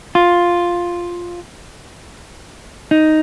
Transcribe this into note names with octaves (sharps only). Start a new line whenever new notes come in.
F4
D#4